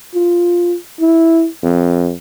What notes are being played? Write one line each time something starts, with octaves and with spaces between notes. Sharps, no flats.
F4
E4
F2